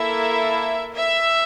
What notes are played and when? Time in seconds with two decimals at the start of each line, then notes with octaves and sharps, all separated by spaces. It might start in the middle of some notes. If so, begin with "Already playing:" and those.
Already playing: A#3 E4 A4 E5
0.94 E5